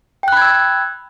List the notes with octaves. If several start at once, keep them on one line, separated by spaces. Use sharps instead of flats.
G5 B5 E6 F#6 G#6